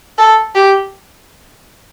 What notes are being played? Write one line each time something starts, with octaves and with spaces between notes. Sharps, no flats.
A4
G4